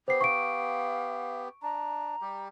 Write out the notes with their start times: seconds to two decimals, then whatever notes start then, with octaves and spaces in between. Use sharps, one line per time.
0.08 B3 G4 C5 C7
0.21 F5 C#6 D7
1.62 D4 A#5
2.21 G3 G4